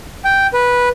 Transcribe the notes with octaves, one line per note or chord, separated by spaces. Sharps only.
G5
B4